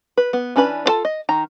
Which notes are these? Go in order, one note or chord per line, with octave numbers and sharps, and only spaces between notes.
B4
B3
E3 C#4 D4 B4 B5
D4 F4 A4 A5
D#5
D#3 A#5